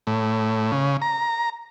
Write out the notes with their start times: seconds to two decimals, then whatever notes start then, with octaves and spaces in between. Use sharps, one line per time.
0.07 A2
0.72 C#3
1.02 A#5